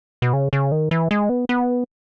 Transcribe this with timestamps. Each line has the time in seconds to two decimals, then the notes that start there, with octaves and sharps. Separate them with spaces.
0.22 B2
0.33 C#3
0.53 C#3
0.72 D#3
0.91 E3
1.11 G#3
1.29 B3
1.49 B3